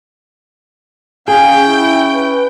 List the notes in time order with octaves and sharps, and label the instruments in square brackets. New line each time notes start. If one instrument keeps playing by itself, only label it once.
[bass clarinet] C#4 [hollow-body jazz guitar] G#4 [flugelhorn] F5 [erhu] G5
[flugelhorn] E4
B4